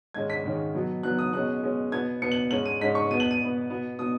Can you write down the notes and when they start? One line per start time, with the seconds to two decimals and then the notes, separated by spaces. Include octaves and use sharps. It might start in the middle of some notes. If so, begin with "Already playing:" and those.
0.14 G#2 D#3 G#3 C#4 G#6
0.30 B6
0.44 G#2 D#3 G#3 C#4
0.74 B2 F#3 B3
1.03 B2 F#3 B3 F#6
1.19 D#6
1.33 B2 G#3 C#4 F#6
1.62 B2 G#3 C#4
1.92 B2 B3 G#6
2.22 B2 B3 C#7
2.32 F#7
2.51 G#2 G#3 C#4 F#7
2.65 D#7
2.81 G#2 G#3 C#4 B6
2.95 C#6
3.10 B2 B3 D#7
3.20 F#7
3.31 D#7
3.40 B2
3.45 B3
3.70 B2 B3
3.99 B2 D#6